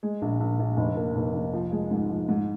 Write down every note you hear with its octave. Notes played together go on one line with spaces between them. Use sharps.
G#3
A#1
A#1
A#1
F1
A#3
F1
F1
F3
G#3
G#2
F3
G#2